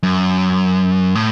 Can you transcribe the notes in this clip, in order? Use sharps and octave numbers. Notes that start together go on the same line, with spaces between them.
F#2
A2